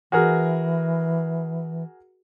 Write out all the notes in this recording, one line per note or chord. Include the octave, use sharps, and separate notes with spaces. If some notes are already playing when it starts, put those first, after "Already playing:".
E3 F#4 G#4 A#4